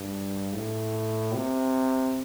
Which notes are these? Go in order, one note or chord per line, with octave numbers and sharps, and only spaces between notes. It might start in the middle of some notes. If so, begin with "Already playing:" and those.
Already playing: G2
A2
C3